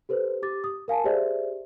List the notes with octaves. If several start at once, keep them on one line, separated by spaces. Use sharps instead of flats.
G4 A4 B4 C5
G4 D6 A6
D#6
A#4 F5 G#5 A5
G4 G#4 C5 D5 E5